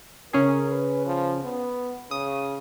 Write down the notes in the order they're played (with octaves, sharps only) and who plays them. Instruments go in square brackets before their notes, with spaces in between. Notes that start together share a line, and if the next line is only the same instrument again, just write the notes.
[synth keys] C#3 C#4 G#4 [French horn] A#4
[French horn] B4
F3
B3
[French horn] C#3 [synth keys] D#6